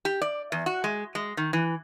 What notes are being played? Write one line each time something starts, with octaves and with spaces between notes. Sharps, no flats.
G4
D5
E2
F#4
G#3
G#3
D#3
E3